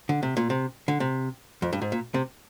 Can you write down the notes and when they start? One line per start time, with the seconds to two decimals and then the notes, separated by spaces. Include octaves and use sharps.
0.09 D3
0.23 C3
0.37 A#2
0.50 C3
0.88 D3
1.00 C3
1.62 F2
1.73 G2
1.82 G#2
1.92 A#2
2.14 C3